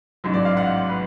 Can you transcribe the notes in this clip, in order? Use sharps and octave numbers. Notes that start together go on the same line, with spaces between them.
A1 G#2 F#3
D5
F5
F#5
B4